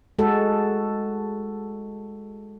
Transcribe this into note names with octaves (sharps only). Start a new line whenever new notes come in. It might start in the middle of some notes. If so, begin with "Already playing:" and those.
G#3 F#4 A4